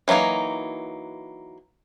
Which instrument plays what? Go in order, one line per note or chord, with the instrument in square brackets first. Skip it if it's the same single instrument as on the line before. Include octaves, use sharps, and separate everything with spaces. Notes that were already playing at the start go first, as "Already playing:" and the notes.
[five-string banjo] E3 F#3 A3 A#3 D#4